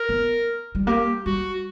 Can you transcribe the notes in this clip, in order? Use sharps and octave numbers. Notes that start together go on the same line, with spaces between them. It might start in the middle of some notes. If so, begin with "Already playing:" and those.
Already playing: A#4
B3
G3
A#3 G4
G3 F#4